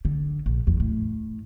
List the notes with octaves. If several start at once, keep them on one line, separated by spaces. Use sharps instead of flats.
D3
A#1
F#1 E2
A2